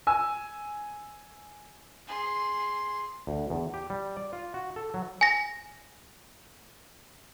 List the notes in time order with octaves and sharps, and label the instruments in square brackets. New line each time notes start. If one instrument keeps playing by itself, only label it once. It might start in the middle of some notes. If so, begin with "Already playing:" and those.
[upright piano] G#5 E6
[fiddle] G#4 C6
[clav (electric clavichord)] D2
E2
G4
G3
D5
F4
F#4
A4
F#3
[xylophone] G#5 A#6